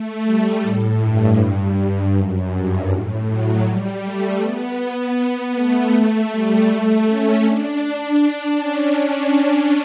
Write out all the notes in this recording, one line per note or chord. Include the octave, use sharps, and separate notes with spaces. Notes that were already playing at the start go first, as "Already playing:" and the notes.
Already playing: A3
G3
A2
G2
G2
G2
F#2
G2
A2
F#3
G3
A3
B3
A3
A3
G3
A3
C#4
D4
D4
C#4